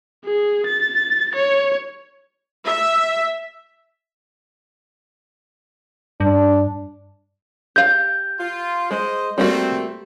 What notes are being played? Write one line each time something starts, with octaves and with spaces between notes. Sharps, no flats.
G#4
A6
C#5
E5
G2 D4
G4 F5 G6
F4
G#3 C5 D#5
G3 A3 A#3 C4 F#4